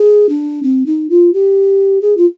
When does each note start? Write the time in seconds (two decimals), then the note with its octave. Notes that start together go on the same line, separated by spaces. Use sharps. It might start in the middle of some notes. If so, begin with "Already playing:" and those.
Already playing: G#4
0.29 D4
0.63 C4
0.86 D#4
1.10 F4
1.33 G4
2.02 G#4
2.17 F4